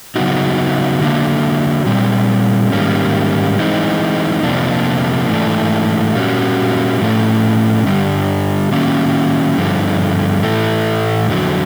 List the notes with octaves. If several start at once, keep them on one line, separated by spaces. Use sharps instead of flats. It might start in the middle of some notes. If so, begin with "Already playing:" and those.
C#3 F#3 B3 D#4 F#4
D3 F#3 A#3 D4
A#2 G3 C4
G#2 D#3 G3 A#3 C#4
E3 G#3 C4 D#4
F2 C3 F3 A#3 D4
G#2 E3 A3 D4
A#2 G3 A#3 C#4 F#4
A2 F3 A3 C#4
G2 D3 G3
D#3 F#3 A#3 C#4
G2 D3 F3
A2 E3 A3
F2 D3 F#3